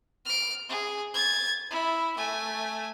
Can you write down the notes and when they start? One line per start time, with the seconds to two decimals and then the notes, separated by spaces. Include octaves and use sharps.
0.25 F6 D7
0.69 G#4
1.14 G#6 A6
1.71 E4
2.17 A3 G#5